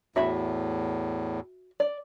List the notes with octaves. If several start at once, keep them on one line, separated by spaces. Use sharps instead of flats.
E2 A2 F#4 E5 B5
D5